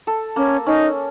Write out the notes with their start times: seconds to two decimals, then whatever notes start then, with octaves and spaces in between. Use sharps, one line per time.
0.07 A4
0.36 A#3 C#4
0.66 C#4 D#4